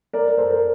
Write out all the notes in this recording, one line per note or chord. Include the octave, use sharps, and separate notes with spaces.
A#4 D5
A4 C5
A#4